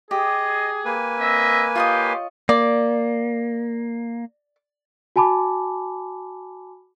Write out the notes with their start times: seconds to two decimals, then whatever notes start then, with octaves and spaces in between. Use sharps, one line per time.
0.11 G4 G#4 D#5
0.85 A#3 B4 G#5
1.19 C4 D#5 E5
1.76 F4 G4 C#5 D#5 G5 C6
2.49 A#3 D5
5.16 F#4 G#5 A5 B5 D6